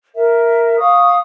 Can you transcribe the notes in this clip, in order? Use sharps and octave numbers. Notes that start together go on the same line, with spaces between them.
A#4 E5
F5 C#6 D#6